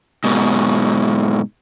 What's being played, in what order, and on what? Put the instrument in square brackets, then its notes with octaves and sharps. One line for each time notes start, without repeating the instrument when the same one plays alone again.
[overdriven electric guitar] G#2 B2